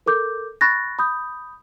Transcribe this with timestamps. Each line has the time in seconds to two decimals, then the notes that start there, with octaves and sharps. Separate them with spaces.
0.06 A4 A#4 D6 G6
0.61 B5 C#6 F#6 A6 A#6
0.99 B5 D#6 G6